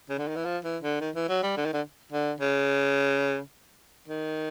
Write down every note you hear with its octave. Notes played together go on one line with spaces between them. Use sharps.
C#3
D3
D#3
E3
F3
E3
D3
D#3
E3
F#3
G3
D3
D#3
D3
D3
C#3
D#3